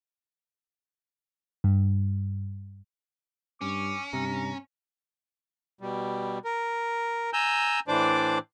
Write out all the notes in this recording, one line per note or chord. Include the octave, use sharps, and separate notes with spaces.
G2
G2 C#4 D6
G2 C3 A#5
B2 G3
A#4
G#5 A#5 E6 G6
A2 E3 D4 C5 D5 D6